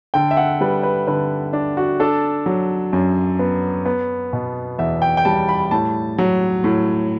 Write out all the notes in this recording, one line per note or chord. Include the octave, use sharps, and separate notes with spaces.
D3 G5
E5
F#5
G3 B4
B4
D3 B4
D4
F#4
D4 A4
F#3
F#2
B3
B3
B2
E2 E5
G5
G5
G3 A5
B5
A2 A5
F#3
A2